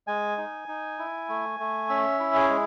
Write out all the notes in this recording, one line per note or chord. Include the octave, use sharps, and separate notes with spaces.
G#3 G#5
D#4
D#4
E4
A3
A3
C#4 E5
E4
G#4
G#3